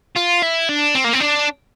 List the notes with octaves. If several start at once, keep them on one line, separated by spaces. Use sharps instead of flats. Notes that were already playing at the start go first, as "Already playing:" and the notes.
F4
E4
D4
C4
A#3
C4
D4